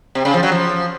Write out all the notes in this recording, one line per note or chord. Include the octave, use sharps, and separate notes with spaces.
C3
C#3
F3
F#3
F3